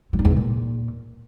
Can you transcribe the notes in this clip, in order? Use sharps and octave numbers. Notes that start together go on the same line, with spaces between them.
F#3
G2
E2
B2
A#2